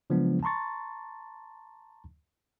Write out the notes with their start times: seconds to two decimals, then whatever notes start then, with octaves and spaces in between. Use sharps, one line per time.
0.10 C#3 F3 F#3 G#3 B3 D4
0.43 A5 A#5 C6 C#6 A6